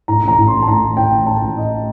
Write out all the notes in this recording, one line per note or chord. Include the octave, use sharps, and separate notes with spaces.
A2 A#5
A1 A#5
A2
A1 C6
A5
A2 A#5
A1
A2 G5
A1
A2 A5
A1
A2 D#5